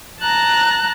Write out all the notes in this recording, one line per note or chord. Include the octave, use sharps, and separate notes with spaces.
A5 A#5 F#6 A#6